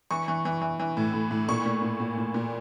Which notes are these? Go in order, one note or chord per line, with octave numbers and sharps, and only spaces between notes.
E3 C#6
E3
E3
E3
E3
A2
A2
A2
A#2 C#6
A#2
A#2
A#2
A#2
A#2